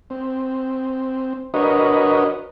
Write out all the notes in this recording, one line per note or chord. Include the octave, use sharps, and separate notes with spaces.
C4
D4 F#4 A#4 B4 C#5 D#5